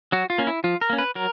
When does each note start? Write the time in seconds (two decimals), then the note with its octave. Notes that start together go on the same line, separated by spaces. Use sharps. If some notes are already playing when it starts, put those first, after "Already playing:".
0.12 F#3 F#4
0.30 F4
0.38 A#3 C#4
0.47 E4
0.64 F3 F4
0.81 A#4
0.90 A#3 C#4
0.98 B4
1.15 F#3 A#4